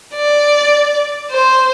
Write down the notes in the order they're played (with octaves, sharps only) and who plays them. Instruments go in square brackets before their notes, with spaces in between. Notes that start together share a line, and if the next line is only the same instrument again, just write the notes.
[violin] D5
C5